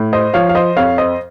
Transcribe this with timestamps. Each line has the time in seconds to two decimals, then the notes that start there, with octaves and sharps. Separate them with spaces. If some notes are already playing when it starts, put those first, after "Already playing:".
Already playing: A2
0.13 C5 D#5
0.34 F3 C#5 F5
0.49 F5
0.55 C5 D#5
0.77 F2 C#5 F5
0.98 C5 D#5